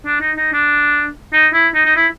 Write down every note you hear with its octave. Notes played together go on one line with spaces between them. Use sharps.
D4
D#4
D#4
D4
D#4
E4
D#4
D#4
E4